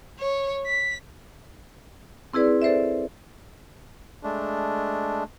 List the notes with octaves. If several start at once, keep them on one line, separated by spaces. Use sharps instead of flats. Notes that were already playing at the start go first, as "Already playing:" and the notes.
C#5
B6
C4 E4 G#4 B4 D5
A4 C5 D5 E5
G#3 A3 D4